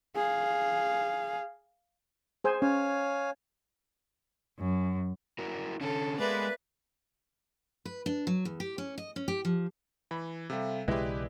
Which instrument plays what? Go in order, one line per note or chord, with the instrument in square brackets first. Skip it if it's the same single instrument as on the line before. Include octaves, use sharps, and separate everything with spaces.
[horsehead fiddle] G#4 F5
[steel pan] G#4 C5 G#5
[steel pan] C#4 [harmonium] C#5 F5 G#5
[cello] F#2
[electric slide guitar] E4 F#4 A#4
[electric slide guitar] D3 C#4 [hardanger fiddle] A4
[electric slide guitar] G#3 [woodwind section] A#3 B3 B4 [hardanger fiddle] D5 E5
[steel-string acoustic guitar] B4
D4
F#3
E2
G4
C#4
D#5
C#4
G4
F3
[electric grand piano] E3 [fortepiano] B5
[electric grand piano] C3 G3 [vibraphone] A4 E5 F5
[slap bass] B1 C#3 E3 [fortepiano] G#3 E4 [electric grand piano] G4 B4 [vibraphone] D5